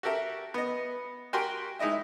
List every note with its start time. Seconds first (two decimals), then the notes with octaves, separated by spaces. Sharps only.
0.03 F#4 G4 A4 A#4 E5
0.54 B3 D#5
1.33 F#4 G4 A#4 G5 G#5 C6
1.79 G#3 D#4 E4 D#5 E5